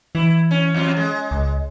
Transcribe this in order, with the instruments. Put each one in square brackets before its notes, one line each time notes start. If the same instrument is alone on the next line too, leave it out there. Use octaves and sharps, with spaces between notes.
[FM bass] E3 [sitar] E4
[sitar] C#4
F2 C4 F4
G#3
[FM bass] C#2